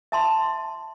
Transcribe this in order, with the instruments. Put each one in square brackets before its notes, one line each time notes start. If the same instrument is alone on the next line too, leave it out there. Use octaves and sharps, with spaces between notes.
[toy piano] E5 A5 C6